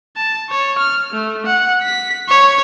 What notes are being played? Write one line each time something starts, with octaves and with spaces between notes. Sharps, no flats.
A5
C#5
F6
A3
F#5
B6
C#5